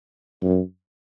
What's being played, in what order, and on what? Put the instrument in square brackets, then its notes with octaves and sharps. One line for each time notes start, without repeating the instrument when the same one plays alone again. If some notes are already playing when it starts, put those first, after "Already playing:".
[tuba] F#2